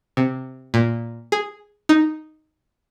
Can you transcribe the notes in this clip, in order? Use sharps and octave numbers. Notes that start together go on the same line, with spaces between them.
C3
A#2
G#4
D#4